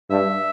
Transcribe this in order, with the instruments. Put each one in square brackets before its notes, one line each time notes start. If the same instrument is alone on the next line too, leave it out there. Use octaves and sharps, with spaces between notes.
[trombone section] G2 [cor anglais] E5